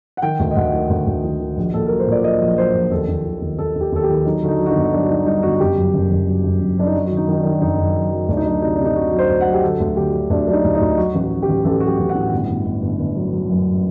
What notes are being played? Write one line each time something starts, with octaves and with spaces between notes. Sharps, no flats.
F#5
D#3 G5
D2
D#5
D2 F#5
D#3
D2
D2
D#3
D#3
A#1
A#2 A4
F#3 A#4
C5
A#2 D5
F#3 D#5
A#1
F#3 C5
A#1
D#2 A4
D#2
D#3
D#2
D#2 A4
D#2
G4
D#2 A4
G4
D#3
F#3 D#4
D3 F#4
D#4
F#3
F#4
D#4
G1
F#3 D4
F#4
F#3 D#4
G2 D#4
G1 F#4
F#4
F#1 G4
F#2
F#1
F#1
F#3
F#1
F#1
F#2 D4
D#4
F#3 F#4
F#4
D#3
D#4
D#3 D#4
D4
D#3
F#4
F#1 D#4
F#1
F#2
F#3
D2 D4
D#4
F#3 D4
C3 D#4
C3 D4
D#4
C3 F#4
F#3
C5
D2
F#5
F#3
G4
D3 A4
D2
D3 G4
D3
D2 D4
F#3 D4
D#4
D2
D#4
D2
F#3 F#4
A1
F#4
F#3
G4
A1
A1 A4
F#3 F#4
G4
A1
F#5
A2
G1
G1
G1
G1
G1
F#3
F#3
F#2